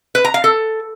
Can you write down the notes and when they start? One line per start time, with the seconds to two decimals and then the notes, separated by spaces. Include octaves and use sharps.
0.15 B4
0.24 A#5
0.34 F5
0.44 A4